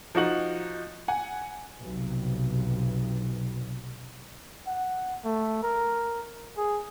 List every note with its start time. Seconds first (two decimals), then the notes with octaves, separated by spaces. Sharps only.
0.15 F3 D#4 F#4 F#7
1.08 F#5 G#5
1.81 B1 F2 C3
4.67 F#5
5.24 A3
5.63 A#4
6.57 G#4